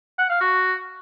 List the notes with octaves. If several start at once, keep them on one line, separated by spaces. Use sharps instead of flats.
F#5
F5
F#4